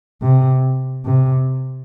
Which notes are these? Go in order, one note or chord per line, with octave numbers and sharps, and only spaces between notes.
C3
C3